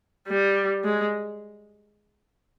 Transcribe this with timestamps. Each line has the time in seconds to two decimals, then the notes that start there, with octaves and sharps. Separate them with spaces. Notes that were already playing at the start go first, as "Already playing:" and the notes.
0.28 G3
0.84 G#3